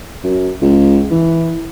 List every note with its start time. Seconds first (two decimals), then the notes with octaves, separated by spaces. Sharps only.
0.24 F#2
0.62 C#2
1.11 E3